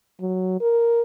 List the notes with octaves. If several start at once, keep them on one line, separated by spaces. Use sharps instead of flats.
F#3
A#4